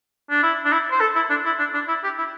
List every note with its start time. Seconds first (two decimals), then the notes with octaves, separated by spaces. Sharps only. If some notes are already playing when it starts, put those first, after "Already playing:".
0.30 D4
0.43 E4
0.65 D4
0.72 E4
0.91 C5
1.00 A4
1.15 E4
1.29 D4
1.45 E4
1.59 D4
1.74 D4
1.88 E4
2.04 G4
2.18 E4